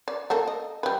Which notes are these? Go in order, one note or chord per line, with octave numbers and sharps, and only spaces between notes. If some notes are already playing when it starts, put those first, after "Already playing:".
D5
A3 A#3 A4
D#5
G3 B4